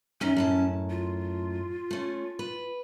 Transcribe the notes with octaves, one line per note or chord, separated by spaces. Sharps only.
F#2 D#3 C#4 D#4
F#2 A2 A5
F4
A3 C#4
B4